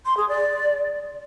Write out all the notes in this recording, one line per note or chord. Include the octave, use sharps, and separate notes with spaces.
C6
G#4
D5